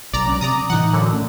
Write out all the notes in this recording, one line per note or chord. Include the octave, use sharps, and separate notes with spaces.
B1 D5 A#5
F#3 G#3 C#4
C3 D5 A#5 D#6
A2 E3 D#4 F#5
F#2 D3
A3 C#4